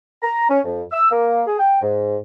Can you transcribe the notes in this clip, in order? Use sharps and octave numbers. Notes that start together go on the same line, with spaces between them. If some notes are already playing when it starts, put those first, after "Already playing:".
A#5
C#4
F2
E6
A#3
G#4
G5
G#2